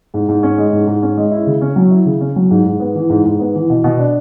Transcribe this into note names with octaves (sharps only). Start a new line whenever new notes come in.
G#2
G#2
C#4
G#3
G#2
G#2
C#4
G#3
E4
C#3
C#4
F#3
E4
C#3
C#4
F#3
G#2
G#2
B3
E3
G#2
G#2
B3
E3
B2
B2
D4